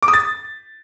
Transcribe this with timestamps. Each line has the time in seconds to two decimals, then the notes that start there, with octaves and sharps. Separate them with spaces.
0.02 D6
0.08 D#6
0.13 A6